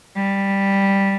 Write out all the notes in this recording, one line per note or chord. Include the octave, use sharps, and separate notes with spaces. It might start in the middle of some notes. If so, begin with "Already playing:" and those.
G3